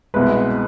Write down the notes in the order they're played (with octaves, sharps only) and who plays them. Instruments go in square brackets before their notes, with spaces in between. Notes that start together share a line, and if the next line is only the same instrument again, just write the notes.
[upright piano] C2 B2 G#3 B4